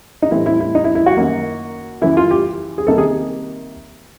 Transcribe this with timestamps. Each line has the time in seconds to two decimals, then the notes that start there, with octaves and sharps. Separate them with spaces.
0.22 D#4
0.31 A2 E3 G3 C4 E4
0.46 E4
0.60 E4
0.75 D#4
0.84 E4
0.95 E4
1.06 F#4
1.17 F#2 D#3 F#3 A#3
2.02 F#2 C#3 E3 E4
2.17 F4
2.31 G4
2.78 G#4
2.87 C3 D#3 G3 A#3 A4
2.98 G#4